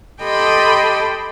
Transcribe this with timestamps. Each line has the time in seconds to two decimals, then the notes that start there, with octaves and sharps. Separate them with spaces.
0.22 G4 A4 D#5 G5 B5 C6